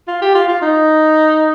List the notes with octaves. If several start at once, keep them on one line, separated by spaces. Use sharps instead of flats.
F4
G4
F4
F4
D#4